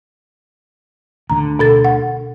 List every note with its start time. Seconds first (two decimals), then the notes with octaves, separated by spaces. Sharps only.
1.30 D2 D3 A#5
1.59 B2 A4 A6
1.85 F#5